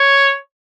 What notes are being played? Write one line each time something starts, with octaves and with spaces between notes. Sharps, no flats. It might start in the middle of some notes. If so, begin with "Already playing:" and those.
Already playing: C#5